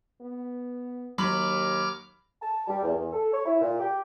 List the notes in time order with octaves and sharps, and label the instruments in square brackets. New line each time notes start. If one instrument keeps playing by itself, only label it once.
[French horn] B3
[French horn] D#2 [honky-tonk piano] F#3 B5 F#7 [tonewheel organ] D6 F6
[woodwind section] A5
G3
E2
E2
A4
C#5
E4
A#2
G4